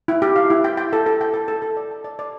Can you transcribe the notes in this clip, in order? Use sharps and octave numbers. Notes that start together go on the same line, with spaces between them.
E4
G4
F5
E4
G5
G5
A4
A4
G5
A4
A4
A4
D5
A5
D5
D5